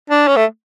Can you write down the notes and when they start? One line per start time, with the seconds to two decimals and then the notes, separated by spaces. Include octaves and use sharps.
0.10 D4
0.27 C#4
0.36 A3